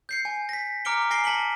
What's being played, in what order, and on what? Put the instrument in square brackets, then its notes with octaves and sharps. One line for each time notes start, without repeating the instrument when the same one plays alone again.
[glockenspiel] G6 C7 C#7
G#5
A#6 B6
A#5 D6 F6 C#7 D7 G7
G#5 A#6 C7 D7 G7
A5 B6 C#7 F#7 G7